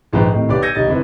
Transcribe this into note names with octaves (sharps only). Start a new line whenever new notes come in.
A#1 G#2 F3 B4 G5
A2 C3 D#3
B1 G4 B4 D5 D6
E6 G6 G#6 A#6 C#7 D#7
B1 D#3 G3 D#5 A6
F#1 C4 E4 B4